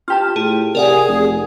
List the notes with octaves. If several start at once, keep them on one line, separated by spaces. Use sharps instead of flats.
F4 G4 A5 F6
A2 G#4
C3 G#4 A#4 D5 F#5
F1